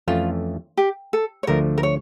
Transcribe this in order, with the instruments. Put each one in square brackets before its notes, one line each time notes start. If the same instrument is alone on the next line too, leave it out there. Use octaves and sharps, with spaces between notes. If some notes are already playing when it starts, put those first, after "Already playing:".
[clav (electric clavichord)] F2 E3 A3 C#4 [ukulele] F4
[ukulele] G4
A4
C#5
[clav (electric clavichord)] D2 D3 F3 A3 [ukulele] A#4
[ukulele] A#4
C#5